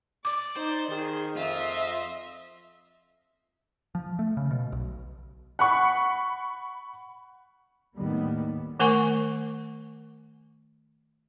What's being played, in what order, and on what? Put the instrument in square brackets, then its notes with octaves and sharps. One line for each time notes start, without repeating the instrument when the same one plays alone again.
[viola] D5 [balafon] D6
[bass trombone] D#4 [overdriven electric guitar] C5
[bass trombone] D#3 [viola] G#4
[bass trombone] F2 [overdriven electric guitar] F4 [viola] D#5 E5
[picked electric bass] F3
A3
C#3
B2
B1
[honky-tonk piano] F#5 B5 C#6
[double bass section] D#2 A2 D#3 G3 B3
[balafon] D#3 A3 A#4 F#5 G#5 C#6